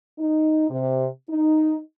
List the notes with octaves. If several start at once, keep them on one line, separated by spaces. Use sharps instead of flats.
D#4
C3
D#4